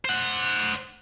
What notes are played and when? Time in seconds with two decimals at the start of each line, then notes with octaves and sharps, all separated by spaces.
0.05 C5 F#5